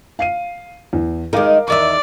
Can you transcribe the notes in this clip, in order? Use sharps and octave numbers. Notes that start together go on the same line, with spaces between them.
F5 C7 D#7
E2
D#3 G#3 A#4 F5 D6
E2 D#3 D5 E5